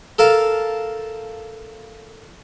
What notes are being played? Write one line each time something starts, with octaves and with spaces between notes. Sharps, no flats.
A4 A#4 F5 A5